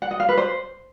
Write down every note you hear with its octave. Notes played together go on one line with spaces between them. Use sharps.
F#5
D#5
F5
B4
C5